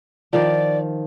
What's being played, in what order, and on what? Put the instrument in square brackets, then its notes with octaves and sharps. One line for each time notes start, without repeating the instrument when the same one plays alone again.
[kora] D#3 F3 [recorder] D5